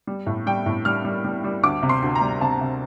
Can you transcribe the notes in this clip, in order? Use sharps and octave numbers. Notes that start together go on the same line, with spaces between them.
G3
A2
G3 G5
A2
G3 F6
G3
G3
G3
D2 D6
C3
C6
D2
A#5
G3
C3 A5
C3